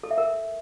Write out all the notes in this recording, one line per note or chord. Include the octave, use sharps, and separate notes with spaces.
A4
E5
A#4